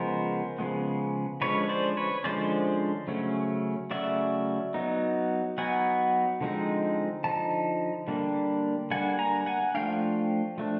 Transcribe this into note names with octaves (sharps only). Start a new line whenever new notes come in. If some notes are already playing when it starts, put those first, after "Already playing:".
Already playing: C#3 F3 G#3 B3 A#4 C5
C#3 F3 G#3 B3
D3 F3 G#3 C#4 B4 C#5
C5 D5
B4 C#5
D3 F3 G#3 C#4 C5 D5
C#3 F#3 A3 C#4
C#3 F#3 A3 C#4 D5 E5
F#3 B3 D#4
F#3 B3 D#4 F#5 G#5
D3 F3 G#3 C4 D#4
D3 F3 D#4 A5
D3 G3 A#3 D4
D3 G3 A#3 D4 F#5 G#5
G#5 A#5
F#5 G#5
F3 A3 D4 F5 G5
F3 A3 D4